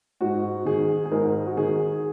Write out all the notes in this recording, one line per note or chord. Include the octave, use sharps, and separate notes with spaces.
G#2 F#4
D#3 G#4
G#4
G#2 A#4
F#4
D#3 G#4